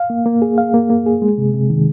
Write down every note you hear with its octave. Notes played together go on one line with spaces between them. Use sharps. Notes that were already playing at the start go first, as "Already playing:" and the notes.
Already playing: F5
A#3
A#3
G#4
F5
A#3
A#3
G#4
G#3
C3
C3
D#3